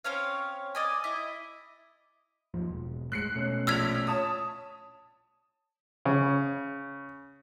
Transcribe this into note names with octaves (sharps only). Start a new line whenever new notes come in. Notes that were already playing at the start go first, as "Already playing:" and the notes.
C4 C#4 C#5 F5
D5 D#5 G#5
E4 D#5
D#2 G#2 F3
E1
A2 G#3 F#6 C7 C#7
B2 A3 C#4
A#1 E6 F6 G#6 B6 F7
C#5 A5 D#6
C#3